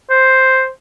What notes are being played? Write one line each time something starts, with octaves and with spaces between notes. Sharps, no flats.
C5